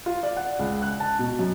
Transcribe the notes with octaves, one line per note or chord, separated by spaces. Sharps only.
F4
D5
F#5
C#2
F#6
A5
B2
F#2